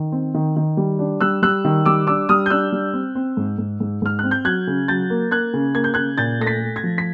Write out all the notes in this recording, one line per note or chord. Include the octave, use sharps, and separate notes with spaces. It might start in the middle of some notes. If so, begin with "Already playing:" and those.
Already playing: D#3
C4
D#3
D#3
G3
D4
G3 E6 F#6
G3 E6 F#6
D#3
G3 D6 E6
D4 D6 E6
G3 D#6 F6
G6
D4 E6 F#6
G3
C4
C4
G#2
G#2
G#2
G#2 F6
C4 F#6
G6
F#3 F#6 G#6
C#3
F#3 G6 A6
A#3
A#3 F#6 G#6
C#3
A#3 G#6
G6
C#3 F#6 G#6
A#2 G6 A6
A3 A#6
A6 B6
A3
G#6 A#6
F3
B6